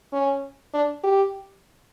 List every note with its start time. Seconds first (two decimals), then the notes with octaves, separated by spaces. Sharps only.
0.13 C#4
0.73 D4
1.04 G4